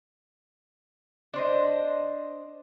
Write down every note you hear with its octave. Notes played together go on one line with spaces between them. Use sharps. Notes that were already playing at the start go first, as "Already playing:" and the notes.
D4 C5 D#5